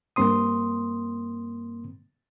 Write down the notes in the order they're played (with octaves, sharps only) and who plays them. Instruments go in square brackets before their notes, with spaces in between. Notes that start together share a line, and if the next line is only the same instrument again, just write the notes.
[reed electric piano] G2 A#3 C4 C6 D#6